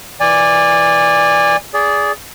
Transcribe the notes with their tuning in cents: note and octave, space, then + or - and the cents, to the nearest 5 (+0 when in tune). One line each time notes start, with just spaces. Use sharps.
E3 +0 D5 +0 G#5 -25
G#4 +0 D5 -20